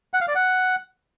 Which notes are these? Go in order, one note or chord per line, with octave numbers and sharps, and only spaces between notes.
F#5
F5
D5
F#5